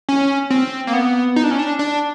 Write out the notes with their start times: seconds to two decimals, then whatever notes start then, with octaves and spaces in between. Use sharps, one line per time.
0.09 C#4
0.50 C4
0.87 A#3
0.93 B3
1.36 D#4
1.44 D4
1.51 C#4
1.59 D4
1.79 D4